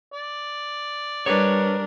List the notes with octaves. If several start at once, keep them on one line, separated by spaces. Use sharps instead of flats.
D5
G3 D4 A#4 B4 C#5